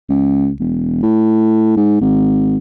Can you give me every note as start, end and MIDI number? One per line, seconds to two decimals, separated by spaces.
0.09 0.51 37
0.60 1.00 28
1.03 1.76 45
1.77 1.97 44
2.01 2.57 32